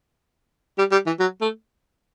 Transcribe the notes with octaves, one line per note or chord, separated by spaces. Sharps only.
G3
G3
E3
F#3
A3